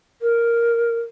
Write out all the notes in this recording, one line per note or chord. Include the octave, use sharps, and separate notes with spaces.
A#4